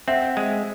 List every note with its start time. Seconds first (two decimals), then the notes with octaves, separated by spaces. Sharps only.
0.08 C4 E5 F#5
0.37 G#3